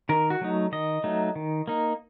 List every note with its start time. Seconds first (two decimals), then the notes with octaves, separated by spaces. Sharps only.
0.09 D#3 A#4
0.30 F#4
0.41 F#3 A3 D#4
0.72 D#3 D#5
1.04 F#3 A3 D#4
1.36 D#3
1.68 A#3 D#4